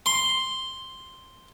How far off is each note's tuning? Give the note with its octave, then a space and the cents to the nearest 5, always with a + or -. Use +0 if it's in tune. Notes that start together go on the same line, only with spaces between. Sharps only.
C6 +0